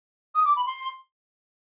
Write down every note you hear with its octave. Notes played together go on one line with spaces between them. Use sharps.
D#6
D6
B5
C6